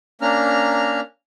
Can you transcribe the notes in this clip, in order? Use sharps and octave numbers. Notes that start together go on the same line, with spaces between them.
A#3 C#4 D4 A#5 F6